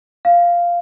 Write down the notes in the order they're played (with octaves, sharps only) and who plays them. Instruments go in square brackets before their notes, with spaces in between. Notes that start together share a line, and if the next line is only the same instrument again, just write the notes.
[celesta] F5